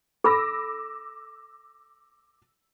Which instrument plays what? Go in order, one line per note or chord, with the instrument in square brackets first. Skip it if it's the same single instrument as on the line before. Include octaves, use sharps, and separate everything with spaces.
[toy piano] A4 B5 [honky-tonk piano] D6 E6 A#6